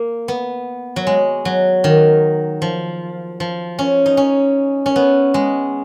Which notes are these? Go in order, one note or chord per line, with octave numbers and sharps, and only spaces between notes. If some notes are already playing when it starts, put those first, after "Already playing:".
Already playing: A#3
B3
F#3
G#3
F#3
D#3
F3
F3
C#4
D#4
C#4
C#4
B3
G#3